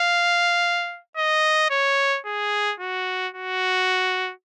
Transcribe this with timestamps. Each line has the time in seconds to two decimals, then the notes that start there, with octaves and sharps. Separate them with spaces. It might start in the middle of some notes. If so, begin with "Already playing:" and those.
Already playing: F5
1.17 D#5
1.70 C#5
2.26 G#4
2.80 F#4
3.34 F#4